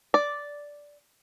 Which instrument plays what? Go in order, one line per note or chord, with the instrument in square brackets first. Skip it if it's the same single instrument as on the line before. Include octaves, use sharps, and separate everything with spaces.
[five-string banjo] D5